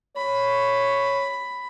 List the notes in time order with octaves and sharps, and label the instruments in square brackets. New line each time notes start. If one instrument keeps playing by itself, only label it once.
[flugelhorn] C#5 [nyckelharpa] B5